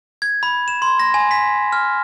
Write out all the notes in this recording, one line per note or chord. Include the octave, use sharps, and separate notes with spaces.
G#6
B5
E7
C6
A#6
G#5
B6
F6